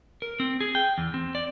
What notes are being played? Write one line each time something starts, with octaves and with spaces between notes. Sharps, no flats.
A#4
C4
G#4
G5
E2
C4
D5